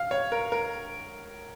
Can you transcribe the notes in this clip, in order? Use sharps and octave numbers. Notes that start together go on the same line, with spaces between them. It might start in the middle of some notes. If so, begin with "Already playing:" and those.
Already playing: F5
C#5
A#4
A#4